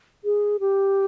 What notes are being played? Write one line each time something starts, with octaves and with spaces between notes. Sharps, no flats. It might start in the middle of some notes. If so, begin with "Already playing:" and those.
G#4
G4